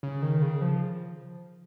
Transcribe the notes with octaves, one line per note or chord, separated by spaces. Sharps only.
C#3
D#3
C#3
F3